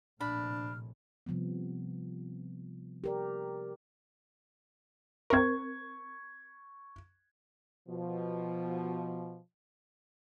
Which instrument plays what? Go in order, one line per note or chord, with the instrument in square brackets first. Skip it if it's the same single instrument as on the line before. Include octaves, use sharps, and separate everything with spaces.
[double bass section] A#1 A2 C3 [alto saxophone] D4 [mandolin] B5 [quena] F6
[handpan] C3 F3 G3 B3
G4 A#4 D5
[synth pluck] C4 A#4 [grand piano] C#6 G#6
[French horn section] B2 F3